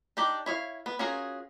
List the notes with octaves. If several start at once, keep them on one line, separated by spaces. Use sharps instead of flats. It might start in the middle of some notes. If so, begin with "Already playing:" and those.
D4 D#4 G4
E4 C#5 E5 F5
B3
C#4 F4 F#4 G#4 A#4